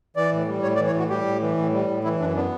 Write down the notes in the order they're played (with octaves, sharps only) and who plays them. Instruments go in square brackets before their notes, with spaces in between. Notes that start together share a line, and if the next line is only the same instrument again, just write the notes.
[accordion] E3 D5
A2
G3
A2 C#5
D5
E3
C#5
A2 F#4
G3 G4
A2
E3
A2
G3
A2
E3 E4
F#2 D4
B3 D4